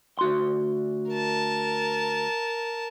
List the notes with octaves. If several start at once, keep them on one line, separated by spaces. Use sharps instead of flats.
D2 F#4 C6
A#4 A5